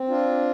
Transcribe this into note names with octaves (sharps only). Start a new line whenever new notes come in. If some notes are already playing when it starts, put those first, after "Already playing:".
Already playing: C4
D4 F4